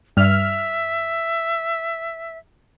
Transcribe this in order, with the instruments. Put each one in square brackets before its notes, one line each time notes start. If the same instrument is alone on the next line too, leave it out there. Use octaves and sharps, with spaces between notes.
[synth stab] G2 F6 [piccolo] E5